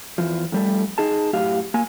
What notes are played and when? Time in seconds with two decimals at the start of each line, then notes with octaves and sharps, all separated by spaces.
0.18 E2 F3
0.52 F2 G3 A3
0.98 D#4 G#4 A5
1.33 F#2 A2 G4 F5
1.74 A#3 G#5